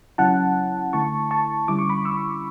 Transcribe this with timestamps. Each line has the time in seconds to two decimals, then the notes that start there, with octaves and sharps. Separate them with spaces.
0.18 C#3 F#3 C#4 E4 F#5 A5
0.93 D3 A3 E4 A5 C#6
1.31 A5 C#6
1.68 D3 G3 C#4 E4 D6
1.79 C#6
1.89 B5 D6
2.05 C#6 E6